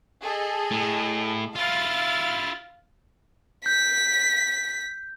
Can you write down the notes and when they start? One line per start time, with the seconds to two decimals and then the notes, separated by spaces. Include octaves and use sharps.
0.21 G#4 A4 D#5
0.71 A2
1.55 E4 F4 F5 F6 A6
3.66 G6 B6